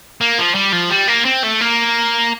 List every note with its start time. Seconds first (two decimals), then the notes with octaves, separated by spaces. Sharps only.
0.21 A#3
0.38 F3
0.55 G3
0.73 F3
0.91 G3
1.08 A#3
1.25 C4
1.43 A3
1.61 A#3